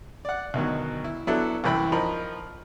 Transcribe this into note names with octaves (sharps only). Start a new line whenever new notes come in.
D5 F#5
D2 B2 D#3 F#3
E4
F#3 B3 D4 E4 A4
C2 F#2 E3 G5 B5
F3 D#4 A#4 B5